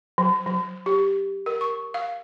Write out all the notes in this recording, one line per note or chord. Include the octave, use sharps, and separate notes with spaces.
F#3
F#3
G4
A#4
C#6
F5